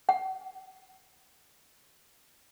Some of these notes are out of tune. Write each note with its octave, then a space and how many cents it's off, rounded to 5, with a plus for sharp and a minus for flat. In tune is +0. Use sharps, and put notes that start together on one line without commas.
F#5 +40